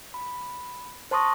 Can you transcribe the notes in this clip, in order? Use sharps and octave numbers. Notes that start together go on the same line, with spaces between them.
B5
C5 A5 C6 C#6 D#6 A#6